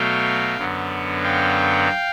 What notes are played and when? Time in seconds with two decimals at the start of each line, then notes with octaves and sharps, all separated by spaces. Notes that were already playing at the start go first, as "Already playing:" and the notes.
Already playing: B2 F#3 A3 F5 G5
0.58 F#2 D3 F#3 B3
1.23 F5 G5